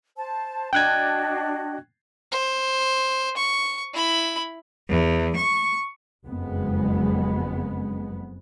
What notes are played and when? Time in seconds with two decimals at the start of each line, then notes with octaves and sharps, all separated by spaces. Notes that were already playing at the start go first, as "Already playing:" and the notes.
0.16 C5 A5
0.73 D4 F#4 D#5 G5 F#6 G#6
2.32 C5
3.37 C#6
3.93 E4 B5
4.89 E2
5.36 C#6
6.24 F#1 F2 G#3 B3